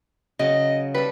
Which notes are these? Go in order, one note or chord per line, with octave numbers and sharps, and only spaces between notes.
C#3 F#3 D#5
G3 A4 B4